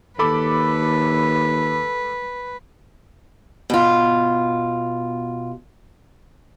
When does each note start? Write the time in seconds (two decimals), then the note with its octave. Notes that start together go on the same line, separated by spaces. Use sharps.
0.19 D#2 A4 B4 B5 D6
3.70 B2 F4